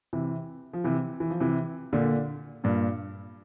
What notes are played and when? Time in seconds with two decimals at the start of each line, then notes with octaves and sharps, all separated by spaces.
0.13 C3 E3
0.73 F3
0.84 C3 E3
1.20 E3
1.30 F3
1.40 C3 E3
1.93 A#2 D3
2.64 G2 A#2